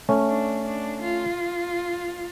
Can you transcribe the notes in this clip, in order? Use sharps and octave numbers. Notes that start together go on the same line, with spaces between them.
A3 C#4
D4
D4
F4